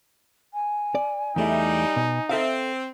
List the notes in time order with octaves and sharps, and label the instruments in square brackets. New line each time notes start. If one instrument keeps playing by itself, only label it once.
[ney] G#5
[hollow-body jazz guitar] D5
[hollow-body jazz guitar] E2 A3 E4 [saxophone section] G3 [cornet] D#4
[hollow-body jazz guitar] B2
[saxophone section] C4 [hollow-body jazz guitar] A4 E5 F5